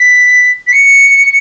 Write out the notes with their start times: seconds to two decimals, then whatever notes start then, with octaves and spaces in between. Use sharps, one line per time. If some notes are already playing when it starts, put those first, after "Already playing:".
Already playing: B6
0.67 B6
0.72 C#7